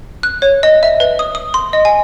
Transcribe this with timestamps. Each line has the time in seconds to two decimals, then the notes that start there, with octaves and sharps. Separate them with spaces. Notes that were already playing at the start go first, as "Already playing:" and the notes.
0.23 F#6
0.42 C#5
0.63 D#5
0.83 E5
1.00 B4
1.19 D#6
1.35 D#6
1.54 C6
1.73 D#5
1.85 G#5